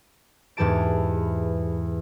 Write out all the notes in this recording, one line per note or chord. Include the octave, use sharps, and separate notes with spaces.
E2 G#2 E3 G4 A5 D7